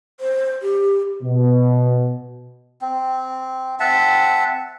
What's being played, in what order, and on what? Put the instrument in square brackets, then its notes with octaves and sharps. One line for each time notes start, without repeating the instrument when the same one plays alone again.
[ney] C5
G4
[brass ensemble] B2
[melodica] C4
C4 E5 F#5 A5